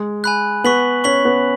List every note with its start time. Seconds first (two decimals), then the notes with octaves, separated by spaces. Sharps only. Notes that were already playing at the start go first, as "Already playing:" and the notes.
Already playing: G#3
0.24 G#5 B5 F#6
0.64 B3 C#6 B6 F#7
1.04 C#4 C#6 B6 F#7
1.25 B3